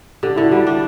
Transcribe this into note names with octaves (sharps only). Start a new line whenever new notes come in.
D3 G4
D3 E4
F#4
G3 E4
D4